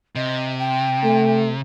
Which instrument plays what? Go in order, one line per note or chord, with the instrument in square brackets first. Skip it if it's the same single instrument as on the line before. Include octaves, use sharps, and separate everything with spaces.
[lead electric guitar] C3 [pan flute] D#5
[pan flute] G5
[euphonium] A3